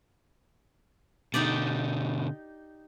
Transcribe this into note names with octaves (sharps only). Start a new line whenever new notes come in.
B2 D3 D#4 G4 D5